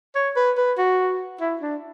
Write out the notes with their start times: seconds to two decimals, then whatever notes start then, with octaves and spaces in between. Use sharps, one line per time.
0.15 C#5
0.36 B4
0.57 B4
0.78 F#4
1.41 E4
1.61 D4